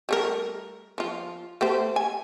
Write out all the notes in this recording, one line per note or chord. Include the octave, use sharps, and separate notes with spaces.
G3 A3 A#4
F3 F4
A3 G4 C5
G#5